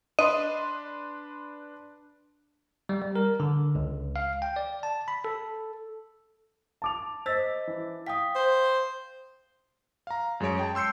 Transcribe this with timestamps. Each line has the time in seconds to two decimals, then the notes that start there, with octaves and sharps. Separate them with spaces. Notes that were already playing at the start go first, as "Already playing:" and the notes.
0.19 D4 B4 D#5 C6
2.89 G3
3.02 G3
3.16 A#4
3.40 D3
3.75 C#2
4.16 F5
4.42 G5
4.56 D5
4.83 A5
5.08 B5
5.25 A4
6.82 A5 D6 F7
7.26 C5 D#5 E6 A6 B6
7.67 E3
8.06 F5 G5 D#6 B6
8.36 C5
10.07 F5 A#5
10.40 F#2 G#3 G#4 C#5 D7
10.59 G5 A5
10.75 C6 E6 G6 C7 C#7